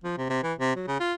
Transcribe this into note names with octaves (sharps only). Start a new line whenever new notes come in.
F3
C3
C3
E3
C3
F#3
C#3
F4